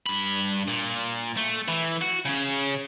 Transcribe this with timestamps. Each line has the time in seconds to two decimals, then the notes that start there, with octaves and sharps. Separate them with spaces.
0.06 G2 B5
0.68 A#2
1.37 A3
1.68 E3 E4
2.01 F#4
2.25 C#3 C#4